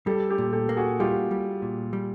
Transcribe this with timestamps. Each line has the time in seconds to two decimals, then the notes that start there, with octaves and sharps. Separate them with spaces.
0.07 G3 G4 A4
0.29 G4 A4
0.38 A#2
0.53 G4 A4
0.69 A#3
0.77 F#4 G#4
1.00 G3 F4 G4
1.31 G3
1.62 A#2
1.93 G3